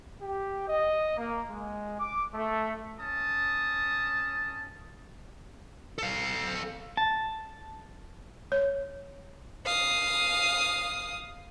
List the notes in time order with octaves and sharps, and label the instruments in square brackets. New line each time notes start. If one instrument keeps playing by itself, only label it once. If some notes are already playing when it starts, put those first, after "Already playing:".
[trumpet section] G4
D#5
A#3
G#3
D6
A3
C#4 A5 D#6
[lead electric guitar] A4 F5
[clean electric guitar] A5
[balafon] C#5
[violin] F5 D#6